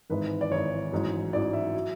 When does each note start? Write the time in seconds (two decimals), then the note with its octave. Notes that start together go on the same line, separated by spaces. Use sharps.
0.10 G#1 G#2 E3 B4
0.41 D5
0.51 G#1 G#2 E3 C#5
0.92 A1 G#2 F#3
1.33 A1 G#2 F#3 D5
1.53 E5
1.74 F#3